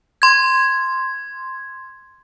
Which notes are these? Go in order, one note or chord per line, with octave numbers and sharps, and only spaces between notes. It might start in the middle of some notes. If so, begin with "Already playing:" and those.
C6 G#6